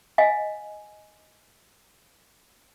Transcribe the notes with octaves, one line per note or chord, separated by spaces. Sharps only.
D#5 F5 G#5